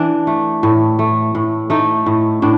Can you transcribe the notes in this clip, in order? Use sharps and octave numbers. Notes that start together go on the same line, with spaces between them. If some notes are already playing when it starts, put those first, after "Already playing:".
Already playing: E3 D4
A3
A2
A3
A2
A3 D#4
A2
A2 D4